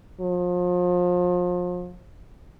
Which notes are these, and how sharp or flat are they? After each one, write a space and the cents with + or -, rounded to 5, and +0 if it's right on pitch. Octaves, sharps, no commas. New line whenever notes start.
F3 +35